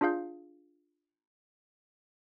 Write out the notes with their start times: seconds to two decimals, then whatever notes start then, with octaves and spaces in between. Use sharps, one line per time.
0.01 D4 F4 G#4 F5 G6